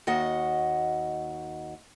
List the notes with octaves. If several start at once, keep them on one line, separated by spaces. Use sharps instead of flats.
D#2 F#4 D#5 F#5